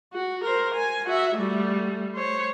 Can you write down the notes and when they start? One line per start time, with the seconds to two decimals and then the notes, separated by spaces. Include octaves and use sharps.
0.13 F#4
0.44 A#4 C5
0.74 G#5
1.06 F#4 E5
1.35 G3 A3
2.15 C5 C#5